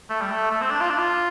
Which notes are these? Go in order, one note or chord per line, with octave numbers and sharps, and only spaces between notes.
A3
G3
A3
A3
C4
D4
F4
D4
F4